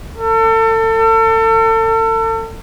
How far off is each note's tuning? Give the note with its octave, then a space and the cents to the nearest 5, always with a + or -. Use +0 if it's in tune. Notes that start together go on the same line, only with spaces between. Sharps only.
A4 +35